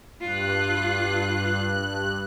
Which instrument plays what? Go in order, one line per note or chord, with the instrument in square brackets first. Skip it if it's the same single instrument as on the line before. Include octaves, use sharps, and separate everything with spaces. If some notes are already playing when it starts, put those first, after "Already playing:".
[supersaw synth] G2 F#6 [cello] F4